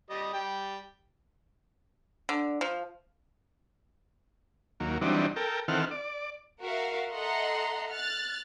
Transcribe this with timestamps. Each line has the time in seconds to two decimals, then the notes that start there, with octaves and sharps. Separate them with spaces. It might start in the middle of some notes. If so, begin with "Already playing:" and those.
0.10 G3 D#5
0.34 G3 G5
2.29 D3
2.61 F3
4.80 D#2 F#3 A#3
5.01 E3 F#3 G3 C4 D4 D#4
5.36 A4 A#4 G5
5.68 D#3 E3 C4 A4 F#5 F6
5.91 D5
6.61 F#4 A#4 E5 F5
7.12 A4 D#5 E5 F#5 A#5 C6
7.90 F6 F#6 A6